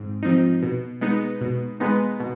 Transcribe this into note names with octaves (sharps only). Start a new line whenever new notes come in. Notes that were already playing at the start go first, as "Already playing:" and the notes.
Already playing: G#2 C4
F3 C4 D#4
B2
G#3 B3 D#4
B2
G#3 B3 D#4
B2